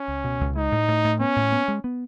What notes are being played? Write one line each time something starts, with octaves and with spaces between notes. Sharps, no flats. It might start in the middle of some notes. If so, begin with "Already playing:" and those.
Already playing: C#4
C#2
B2
C#2
G#3 D#4
A2
A2
A2
B3 C#4
A2
B3
G#3
B3